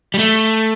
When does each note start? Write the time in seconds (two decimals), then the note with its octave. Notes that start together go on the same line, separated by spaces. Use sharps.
0.14 G3
0.19 A3